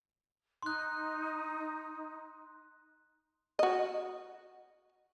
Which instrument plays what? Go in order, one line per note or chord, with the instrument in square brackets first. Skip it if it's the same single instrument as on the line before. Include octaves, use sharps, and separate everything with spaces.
[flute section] D#4 [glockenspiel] C6 F#6
[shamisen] F#4 D#5